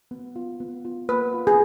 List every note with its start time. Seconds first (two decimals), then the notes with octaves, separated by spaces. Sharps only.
0.11 B3
0.36 F4
0.60 B3
0.85 F4
1.09 A#3 B4
1.34 F4
1.47 G#4